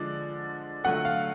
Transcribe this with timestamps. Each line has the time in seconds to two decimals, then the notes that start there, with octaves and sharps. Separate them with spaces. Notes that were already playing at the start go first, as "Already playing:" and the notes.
Already playing: D3 F3 G#3 D5
0.84 D3 F#3 A3 F4 F#5
1.05 F5